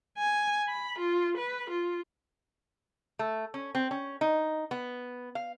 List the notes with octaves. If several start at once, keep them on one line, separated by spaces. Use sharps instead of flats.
G#5
B5
F4
B4
F4
A3
C#4
C4
C#4
D#4
B3
F5